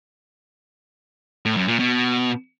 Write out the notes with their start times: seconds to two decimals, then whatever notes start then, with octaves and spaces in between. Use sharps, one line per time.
1.45 A2
1.57 F#2
1.68 A#2
1.80 B2